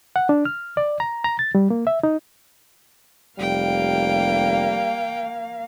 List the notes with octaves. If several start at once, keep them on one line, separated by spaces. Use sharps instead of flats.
F#5
D4
F6
D5
A#5
A#5
A6
G3
A#3
E5
D#4
F1 G3 A#3 F5 G5